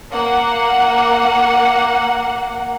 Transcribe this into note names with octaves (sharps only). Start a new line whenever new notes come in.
A#3 F#5